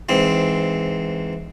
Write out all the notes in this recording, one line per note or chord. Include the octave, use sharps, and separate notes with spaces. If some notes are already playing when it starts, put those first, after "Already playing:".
G#2 E3 C4